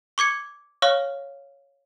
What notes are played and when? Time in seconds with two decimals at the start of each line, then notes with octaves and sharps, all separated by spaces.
0.18 C#6 D6 G#6 C#7
0.82 C#5 F5 C#6 F6